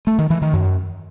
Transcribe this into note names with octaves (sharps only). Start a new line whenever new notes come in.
A3
D#3
E3
D#3
F#2